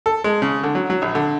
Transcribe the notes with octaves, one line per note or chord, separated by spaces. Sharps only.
A4
G#3
C#3
D3
F#3
F#3
A#1
D3